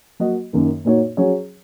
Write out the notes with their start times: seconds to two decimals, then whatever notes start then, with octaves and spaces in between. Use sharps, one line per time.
0.19 F#3 A#3 F#4 D#5
0.53 F#2 D#3 A#3
0.85 A#2 A#3 D#4 F#4 C#5
1.17 F#3 C#4 G#4 C#5